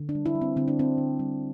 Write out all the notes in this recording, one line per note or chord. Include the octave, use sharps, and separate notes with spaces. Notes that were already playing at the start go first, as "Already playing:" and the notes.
Already playing: D3
D4
G3
E4
G3
C4
D3 C4
D4
G3 C4
D3
G3